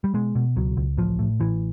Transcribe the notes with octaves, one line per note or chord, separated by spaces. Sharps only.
G3
B2 G#3
B2
C#2 F#3
C#2
A1 F3
A2
A1 E3